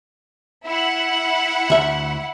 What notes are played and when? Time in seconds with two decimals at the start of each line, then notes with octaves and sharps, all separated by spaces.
0.65 E4 F#5
1.70 D2 E5